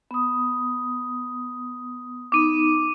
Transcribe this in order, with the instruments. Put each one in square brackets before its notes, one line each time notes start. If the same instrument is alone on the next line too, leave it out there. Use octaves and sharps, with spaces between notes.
[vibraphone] B3 D#6
[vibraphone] B3 D#4 [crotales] D6 D#7